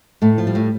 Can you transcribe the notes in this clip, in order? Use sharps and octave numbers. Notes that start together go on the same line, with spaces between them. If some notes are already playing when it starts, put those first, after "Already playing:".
A2 A3
F3
G3
A2